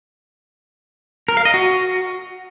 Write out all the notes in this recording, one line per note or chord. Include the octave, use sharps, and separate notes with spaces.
A#4
F5
D#5
F#4